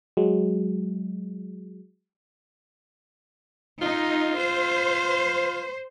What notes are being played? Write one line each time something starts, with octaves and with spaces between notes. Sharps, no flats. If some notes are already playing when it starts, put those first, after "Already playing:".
F#3 G#3
D#4 F4
C5